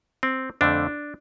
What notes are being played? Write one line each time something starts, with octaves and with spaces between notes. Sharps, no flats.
C4
F2 D3 A3 D4